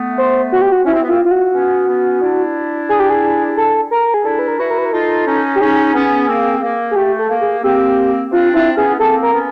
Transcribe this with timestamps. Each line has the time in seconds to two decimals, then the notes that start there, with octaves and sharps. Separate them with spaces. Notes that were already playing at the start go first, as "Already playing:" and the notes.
Already playing: A3 B3
0.18 C5
0.52 F#4
0.62 G4
0.72 F#4
0.85 C#4 E4
0.94 C4
1.03 B3
1.09 A#3 C4 F4
1.25 F4
1.31 F#4
1.53 B3 C#4
1.87 B3 C#4
2.22 D4 E4
2.89 G#4
3.00 G4
3.10 G#4
3.57 A4
3.91 A#4
4.14 G#4
4.24 D4 E4 A4
4.39 B4
4.48 A#4
4.59 E4 F#4 B4
4.70 A#4
4.78 B4
4.85 A#4
4.93 D#4 F4 A4
5.27 C#4 D#4
5.55 G4
5.60 C#4 D#4 G#4
5.94 B3 C#4
6.28 A#3 C4
6.63 A#3
6.91 G#4
6.96 A3 G4
7.19 A4
7.30 A#3
7.41 G#4
7.63 A#3 C4 G4
8.32 C4 D4 F4
8.54 C4 D4 E4
8.77 B3 C#4 G#4
8.99 A#3 C4 A4
9.23 A#4
9.33 B3 C#4